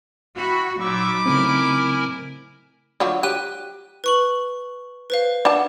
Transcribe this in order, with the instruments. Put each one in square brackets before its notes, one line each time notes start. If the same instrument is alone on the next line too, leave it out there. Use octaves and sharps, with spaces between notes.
[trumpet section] E4 G5 B5 [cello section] F#4
[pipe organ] A#2 C#6 E6 [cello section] F#3 [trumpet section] D#4 B5 D6
[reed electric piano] C#3 A3 C4 [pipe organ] E4 A#4 G#5
[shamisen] D3 F3 F#3
[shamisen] G4 [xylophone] F#6 D#7
[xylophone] B4 C#6 F#7
B4 C5 F5
[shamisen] D4 F#5 A5